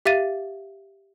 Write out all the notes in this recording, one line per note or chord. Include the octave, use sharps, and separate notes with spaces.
G4 E5 F5 A6 D#7